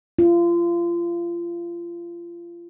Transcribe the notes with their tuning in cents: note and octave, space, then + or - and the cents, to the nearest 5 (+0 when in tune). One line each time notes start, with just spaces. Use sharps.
F4 -30